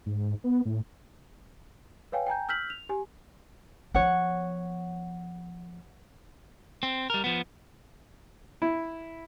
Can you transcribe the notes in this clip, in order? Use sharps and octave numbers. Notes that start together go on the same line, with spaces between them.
G#2
B3
A2
B4 C#5 F5 G5 G#5
G5 G#5 A#5 G6
E6 F6 G6 B6 F#7
F7
G4 G#5
F3 B3 C#5 F#5
C4
G3 A#4
F3 B3
E4